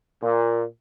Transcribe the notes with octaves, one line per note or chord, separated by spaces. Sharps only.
A#2